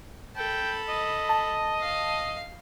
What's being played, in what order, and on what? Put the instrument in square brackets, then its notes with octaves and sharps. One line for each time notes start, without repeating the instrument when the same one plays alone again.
[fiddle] A4 B5 [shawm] G5
[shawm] D#5
[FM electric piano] A5
[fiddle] F5